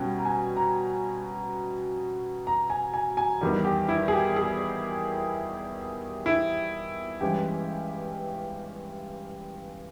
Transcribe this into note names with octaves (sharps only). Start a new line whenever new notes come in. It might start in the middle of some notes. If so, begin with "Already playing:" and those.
Already playing: B2 G3 C#4 G5
A#5
G#5
A#5
A#5
G#5
G#5
G#5
E2 D#3 G3
G4
E4
G#4
G4
G#4
E4
G2 E3 G#3 C#4 G4